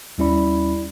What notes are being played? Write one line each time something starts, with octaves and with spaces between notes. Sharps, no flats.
D#2 G3 C#4 E4 D5 B5